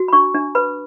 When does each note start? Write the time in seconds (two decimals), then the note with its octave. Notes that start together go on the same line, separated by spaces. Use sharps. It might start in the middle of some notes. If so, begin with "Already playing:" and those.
Already playing: F#4
0.08 B5
0.13 D4 C#6
0.35 D4
0.55 B4 B5